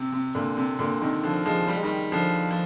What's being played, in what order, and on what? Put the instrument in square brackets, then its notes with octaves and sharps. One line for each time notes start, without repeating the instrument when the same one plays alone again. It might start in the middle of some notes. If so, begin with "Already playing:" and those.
Already playing: [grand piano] C3
C3
A#2 D3
C3
A#2 D3
C3 D#3
D3 F3
F3 G#3
G3
G#3
D#3 G3
D3 F3
F3